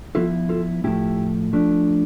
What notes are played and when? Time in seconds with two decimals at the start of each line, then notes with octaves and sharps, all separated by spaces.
0.15 F3 B3 E4 F4 A4
0.49 F4 A4
0.84 A2 F3 A3 E4 G4
1.53 F3 A3 D4